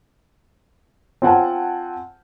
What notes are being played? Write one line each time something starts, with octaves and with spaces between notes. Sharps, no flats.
C4 F4 C5 F#5 G#5 A5